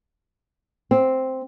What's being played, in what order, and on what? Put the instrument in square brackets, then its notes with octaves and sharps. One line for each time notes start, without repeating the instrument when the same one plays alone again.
[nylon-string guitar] C4